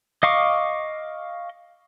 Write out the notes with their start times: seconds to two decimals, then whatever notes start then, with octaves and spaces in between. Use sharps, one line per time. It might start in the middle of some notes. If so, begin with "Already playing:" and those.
0.23 D#5 F5 C#6 D6